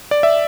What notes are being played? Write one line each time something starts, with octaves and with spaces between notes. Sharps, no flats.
D5
E5